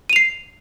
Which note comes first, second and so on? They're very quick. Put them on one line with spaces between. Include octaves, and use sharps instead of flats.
D#7 F7 C7